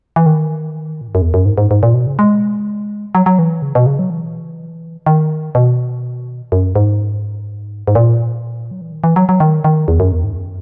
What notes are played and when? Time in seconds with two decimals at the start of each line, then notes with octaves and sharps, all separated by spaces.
0.16 E3
0.26 D#3
1.01 A#2
1.08 G#2
1.15 F#2
1.22 E2
1.34 F#2
1.46 G#2
1.58 G#2
1.71 G#2
1.83 A#2
1.94 B2
2.07 C#3
2.19 G#3
3.15 F#3
3.26 F#3
3.39 E3
3.62 C#3
3.75 B2
3.86 C#3
3.99 F#3
4.10 E3
5.06 D#3
5.55 B2
6.52 F#2
6.76 G#2
7.87 G#2
7.95 A#2
8.71 F#3
8.81 E3
8.92 D#3
9.04 E3
9.16 F#3
9.29 F#3
9.40 D#3
9.64 D#3
9.88 E2
10.00 F#2
10.12 E2
10.24 G#2
10.33 E2
10.36 F#2